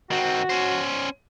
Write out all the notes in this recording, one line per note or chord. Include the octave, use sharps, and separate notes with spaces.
D#3 C4 F#4
C#4 C5